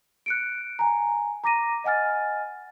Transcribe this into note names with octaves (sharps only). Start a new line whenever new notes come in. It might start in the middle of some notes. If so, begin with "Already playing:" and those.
F#6 C#7 D7
G#5 A#5
A#5 D6 A#6 D#7
D#5 F#5 G#5 F6 A6